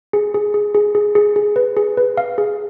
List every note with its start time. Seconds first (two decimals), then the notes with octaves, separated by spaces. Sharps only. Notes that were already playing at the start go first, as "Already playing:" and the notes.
0.13 G#4
0.34 G#4
0.54 G#4
0.74 G#4
0.95 G#4
1.15 G#4
1.36 G#4
1.56 B4
1.77 G#4
1.97 B4
2.17 F5
2.38 G#4